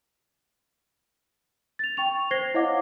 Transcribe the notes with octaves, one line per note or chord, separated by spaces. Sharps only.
A6 F7
G5 C#6 F7
C5 G#6 A#6 C7 G7
E4 C#5 D#5 F5 F#5 D6